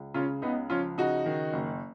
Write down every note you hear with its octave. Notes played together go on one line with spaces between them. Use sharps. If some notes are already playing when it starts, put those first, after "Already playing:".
Already playing: C#2
C#3 C#4 F4
C#2 B3 D#4
F3 C#4 F4
C#3 D#4 F#4
D#3
F#1